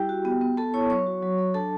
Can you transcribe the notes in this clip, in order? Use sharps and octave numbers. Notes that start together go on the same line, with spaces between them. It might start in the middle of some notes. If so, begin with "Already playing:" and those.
Already playing: G3 E4 G4 G5
F#4
B3
B3
B3 A4 A5
E4 C#5 C#6
F#3 C#5 C#6
F#4
F#3
F#3
D4 A4 A5